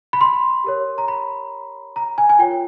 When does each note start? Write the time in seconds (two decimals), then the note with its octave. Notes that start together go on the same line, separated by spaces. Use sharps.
0.13 B5
0.21 C6
0.64 G4 A#4 C#5
0.98 A#5
1.08 B5
1.96 A#5
2.18 G#5
2.29 G#5
2.39 F4 A#4 C#5 G5